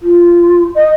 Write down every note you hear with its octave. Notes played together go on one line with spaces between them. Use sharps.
F4
D#5